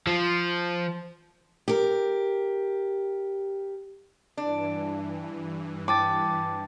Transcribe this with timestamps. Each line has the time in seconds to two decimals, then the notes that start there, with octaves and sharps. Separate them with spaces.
0.07 F3
1.68 G4 A#4
4.37 G2 E3 D4
5.88 G5 A5 D6 A6